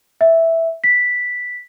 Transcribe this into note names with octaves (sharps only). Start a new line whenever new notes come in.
E5
B6